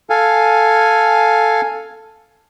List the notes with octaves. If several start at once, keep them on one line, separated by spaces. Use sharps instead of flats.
A4 F5 G#5